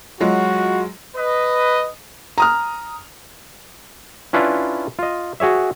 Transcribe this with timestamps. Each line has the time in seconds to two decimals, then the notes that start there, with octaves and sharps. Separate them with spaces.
0.21 F#3 G#3 F4 F#4
1.16 B4 D#5
2.38 A#5 D#6 F6
4.33 C#4 D4 E4 F4 B4
4.99 F4 D#5
5.40 F#4 G#4 C#5 E5